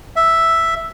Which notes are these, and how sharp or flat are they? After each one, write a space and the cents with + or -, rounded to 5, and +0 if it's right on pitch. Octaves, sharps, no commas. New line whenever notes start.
E5 +0